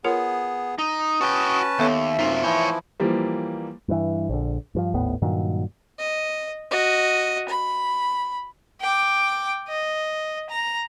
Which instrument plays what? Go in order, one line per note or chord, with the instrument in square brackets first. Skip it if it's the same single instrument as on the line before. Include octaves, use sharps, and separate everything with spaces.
[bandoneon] B3 G#4 [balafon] F4 A#4 C#5
[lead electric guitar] D#4 [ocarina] D#6
[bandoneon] C#4 B4 A5 [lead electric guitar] F#4 G5
[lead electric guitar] D#2 [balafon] B3 A4 C#5 [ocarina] E5
[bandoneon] F#2 [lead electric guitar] C3 F4 [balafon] D#4
[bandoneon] E3 F3 E4 [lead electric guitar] C#5 G5
[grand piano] E3 F3 G3 A#3
[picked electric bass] G2 E3
A#1 D3
G2 E3 F3
G#1 D#2 A2 B3
G2 A#2 D#3 F#3
[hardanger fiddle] D#5
F#4 D#5
B5
[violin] G5 D6
D#5
A#5